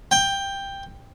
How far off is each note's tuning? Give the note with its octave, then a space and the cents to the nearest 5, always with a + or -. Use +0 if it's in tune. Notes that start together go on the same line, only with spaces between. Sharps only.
G5 +10